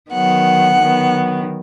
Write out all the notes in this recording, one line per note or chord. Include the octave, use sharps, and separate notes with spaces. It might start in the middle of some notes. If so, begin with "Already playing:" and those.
D#3 F#3 B3 F#5
D#3 F#3 B3